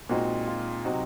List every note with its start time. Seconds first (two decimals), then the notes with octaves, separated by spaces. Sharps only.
0.09 A#2 G#3 C4 D#4 F#4
0.47 F4
0.85 C3 F#3 C4 D#4 F#4